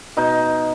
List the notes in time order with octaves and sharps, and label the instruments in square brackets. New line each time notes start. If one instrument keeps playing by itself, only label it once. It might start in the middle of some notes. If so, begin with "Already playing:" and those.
[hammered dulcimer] B2 D#4